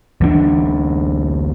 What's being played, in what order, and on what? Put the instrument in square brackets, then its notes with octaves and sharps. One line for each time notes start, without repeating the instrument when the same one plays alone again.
[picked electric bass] D2 E3 B3 D4